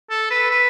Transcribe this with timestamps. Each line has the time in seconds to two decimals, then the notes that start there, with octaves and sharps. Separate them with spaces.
0.10 A4
0.31 B4
0.51 B4